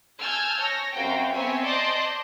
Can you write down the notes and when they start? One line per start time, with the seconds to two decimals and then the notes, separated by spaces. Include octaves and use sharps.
0.21 G#5 A5 E6 F6 G6 G#6
0.60 C#5 A#6
0.95 F#2 C4 F#4 A#4 F5 G5
1.34 B3 C4 C5 C#5 E5 G#5
1.64 D5 D#5 A5 C6 D6 G6